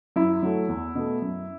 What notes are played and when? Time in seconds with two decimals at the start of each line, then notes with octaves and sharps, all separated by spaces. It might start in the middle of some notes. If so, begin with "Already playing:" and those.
0.16 F#2 E4
0.43 F#3 A3
0.68 E2
0.95 B2 A3
1.22 F#2